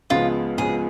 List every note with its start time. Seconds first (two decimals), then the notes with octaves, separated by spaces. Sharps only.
0.10 C#2 C#3 F3 G#3 B3 F4
0.58 C#2 C#3 F3 G#3 B3 G#4